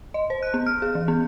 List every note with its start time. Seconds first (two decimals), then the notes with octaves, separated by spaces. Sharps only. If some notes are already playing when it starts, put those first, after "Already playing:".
0.14 D#5
0.30 C5
0.43 F#6
0.54 B3
0.66 F6
0.82 G#4
0.95 E3
1.08 B3